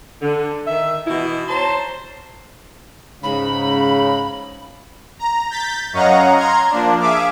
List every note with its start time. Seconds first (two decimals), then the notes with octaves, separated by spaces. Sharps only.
0.21 D3
0.67 D#3 E5
1.07 B2 E3 D#4 E4
1.48 C5 C#5 A5 A#5 C6
3.23 G#2 C#3 B5
5.19 A#5
5.51 G6 A6 B6
5.93 F#2 C#5 D#5 F5 F#5 A#5
6.36 A#5 C6 F6 G#6
6.70 F3 A#3 D4
7.00 G#4 E5 F5 D6